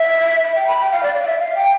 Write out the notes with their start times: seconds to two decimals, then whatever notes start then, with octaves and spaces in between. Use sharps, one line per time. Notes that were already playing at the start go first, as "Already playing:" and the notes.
Already playing: E5
0.44 E5
0.56 G5
0.67 B5
0.80 G5
0.91 F5
1.03 D5
1.15 D5
1.23 F5
1.27 E5
1.39 F5
1.55 G5